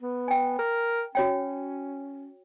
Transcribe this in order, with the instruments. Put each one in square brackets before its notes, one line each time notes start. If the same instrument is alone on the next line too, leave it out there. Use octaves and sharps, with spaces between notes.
[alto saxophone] B3
[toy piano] G5 G#5
[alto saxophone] A#4
[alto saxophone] C#4 [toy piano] F#4 C#5 G5